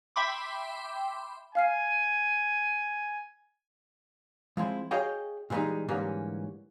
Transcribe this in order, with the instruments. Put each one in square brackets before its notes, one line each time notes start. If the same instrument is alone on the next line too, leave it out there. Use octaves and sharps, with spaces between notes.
[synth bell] E5 G5 B5 C6 D6
[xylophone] F5 F6 C7 [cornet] G#5
[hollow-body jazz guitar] F3 G#3 C4 E4
F#4 G#4 C#5 D#5 F5 G5
A#2 E3 G3 G#3 D#4
G#2 D3 E3 G3 A#3 C#4